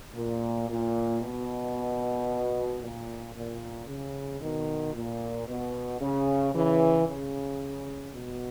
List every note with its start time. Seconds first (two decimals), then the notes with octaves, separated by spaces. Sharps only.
0.15 A#2
0.69 A#2
1.22 B2
2.81 A#2
3.35 A#2
3.87 C#3
4.41 B2 D#3
4.94 A#2
5.47 B2
6.00 C#3
6.54 C#3 E3
7.07 C#3
8.13 B2